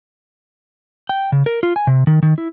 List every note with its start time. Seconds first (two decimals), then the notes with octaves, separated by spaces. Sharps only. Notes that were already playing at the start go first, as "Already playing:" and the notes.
1.09 G5
1.32 C#3
1.46 A#4
1.63 F4
1.76 G#5
1.87 C3
2.07 D#3
2.23 D#3
2.38 E4